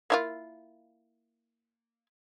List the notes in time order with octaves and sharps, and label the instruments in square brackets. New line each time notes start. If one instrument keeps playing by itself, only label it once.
[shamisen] A#3 E4 F4